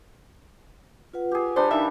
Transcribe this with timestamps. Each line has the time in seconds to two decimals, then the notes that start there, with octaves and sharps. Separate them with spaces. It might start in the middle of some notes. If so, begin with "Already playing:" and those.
1.14 F4 B4 F#5
1.31 G4 G#4
1.56 G3 D4 C5 C#5
1.71 E3 D#4 A#4 E5 F5